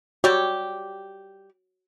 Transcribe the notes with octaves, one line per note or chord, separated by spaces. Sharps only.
G3 F#4 G4 C#5 E6